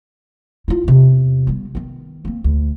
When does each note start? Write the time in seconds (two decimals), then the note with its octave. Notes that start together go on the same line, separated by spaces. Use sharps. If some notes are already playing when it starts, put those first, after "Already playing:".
0.68 E4 F4
0.84 E2 C3
1.47 G3 B3
1.75 D#3 B3
2.25 A#3 C4
2.44 D2